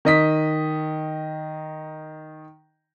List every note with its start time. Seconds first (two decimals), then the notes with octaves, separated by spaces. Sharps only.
0.05 D#3 D#5 B6